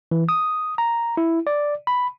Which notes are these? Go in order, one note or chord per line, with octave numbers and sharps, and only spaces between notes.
E3
D#6
A#5
E4
D5
B5